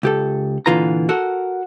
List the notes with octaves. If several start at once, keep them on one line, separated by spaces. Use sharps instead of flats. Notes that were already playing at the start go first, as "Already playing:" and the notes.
C#2 G4 A4
A#2 D3 E3 F4 B4 A#5
F#4 A4 A#4 F#5